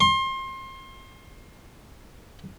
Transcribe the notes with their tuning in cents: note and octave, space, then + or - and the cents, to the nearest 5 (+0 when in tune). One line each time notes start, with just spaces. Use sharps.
C6 +30